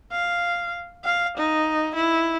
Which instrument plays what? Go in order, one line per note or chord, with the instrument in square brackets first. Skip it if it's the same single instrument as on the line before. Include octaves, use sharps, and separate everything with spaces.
[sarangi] F5
F5
D#4
E4